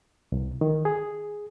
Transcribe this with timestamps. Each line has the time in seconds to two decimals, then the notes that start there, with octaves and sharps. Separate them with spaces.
0.32 C2
0.61 D#3
0.85 G#4